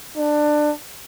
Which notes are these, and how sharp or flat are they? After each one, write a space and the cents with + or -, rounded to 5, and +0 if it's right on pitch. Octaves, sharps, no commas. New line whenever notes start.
D4 +20